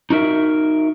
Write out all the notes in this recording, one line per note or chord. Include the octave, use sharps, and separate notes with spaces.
D#4 F#4 A#4 E5